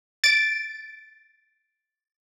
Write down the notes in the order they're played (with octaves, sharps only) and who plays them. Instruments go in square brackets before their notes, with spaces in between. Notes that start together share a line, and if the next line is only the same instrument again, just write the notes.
[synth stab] A6 D7